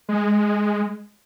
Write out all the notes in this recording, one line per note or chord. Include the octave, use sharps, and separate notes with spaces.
G#3